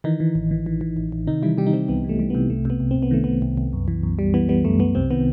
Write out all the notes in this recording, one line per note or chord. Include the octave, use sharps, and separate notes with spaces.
D#3 E3 D#4
E3
A1
E3
E3
E3
A1
A1
C3 D#3 D#4
E3 G3 E4
C3 G3 G4
D#4
C3 G3 C4
C2 B3
E3
A3
G3
C3 B3
C2 A3
C3 B3
C2
C2 C4
B3
D#3 A3
D#3 B3
C2
C2
F#2
E3
F#2
G3
E3 B3
G3 B3
F#2 A3
F#2 B3
C2 C3 C4
D#3 B3